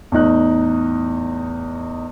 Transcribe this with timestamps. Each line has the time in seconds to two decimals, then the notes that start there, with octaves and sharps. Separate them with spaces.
0.12 E2 A2 D#4 F#6